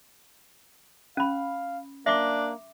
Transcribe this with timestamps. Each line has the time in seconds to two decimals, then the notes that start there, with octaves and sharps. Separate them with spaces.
1.17 C#4 F5 B5
2.06 A#3 D4 E5 D6